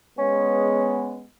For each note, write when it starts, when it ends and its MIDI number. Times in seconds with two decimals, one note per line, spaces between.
0.19 1.25 56
0.19 1.25 59
0.19 1.21 61